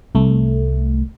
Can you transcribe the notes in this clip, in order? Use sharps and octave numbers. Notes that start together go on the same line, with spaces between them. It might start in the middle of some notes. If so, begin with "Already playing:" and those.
C2 A3